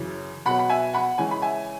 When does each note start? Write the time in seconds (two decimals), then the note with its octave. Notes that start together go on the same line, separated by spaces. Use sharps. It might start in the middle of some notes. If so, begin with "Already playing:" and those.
Already playing: F#2 C#3 E3
0.45 B2 F#3 B3 F#5 B5
0.59 B5
0.70 E5 G#5
0.93 F#5 B5
1.18 C#3 E3 G#3 C#4 E4 G#5
1.31 B5
1.42 E5 G#5